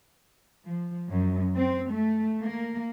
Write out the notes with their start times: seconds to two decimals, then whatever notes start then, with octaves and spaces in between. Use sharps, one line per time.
0.67 F3
1.10 F#2
1.56 C4
1.91 A3
2.43 A#3